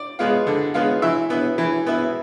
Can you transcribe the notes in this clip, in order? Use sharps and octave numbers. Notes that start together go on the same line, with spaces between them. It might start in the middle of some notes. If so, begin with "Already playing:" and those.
Already playing: D5
G#3 B3 F4
D3
G#3 B3 F4
E3 E5
B3 E4
E3
B3 E4